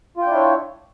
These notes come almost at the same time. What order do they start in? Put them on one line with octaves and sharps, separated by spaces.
F4 G5 D4 E4 C#5